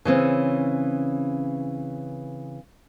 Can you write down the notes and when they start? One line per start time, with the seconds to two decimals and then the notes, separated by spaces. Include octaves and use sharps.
0.05 C#3 E3 C4 C#4